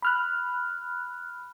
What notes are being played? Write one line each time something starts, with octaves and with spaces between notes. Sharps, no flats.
B5 F6 F#6